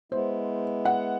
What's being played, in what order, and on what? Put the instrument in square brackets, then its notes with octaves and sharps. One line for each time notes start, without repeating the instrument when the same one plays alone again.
[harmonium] G#3 B3 E4 [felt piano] C5
[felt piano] F#5